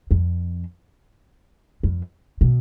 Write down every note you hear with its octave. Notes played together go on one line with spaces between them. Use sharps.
F2
F2
B2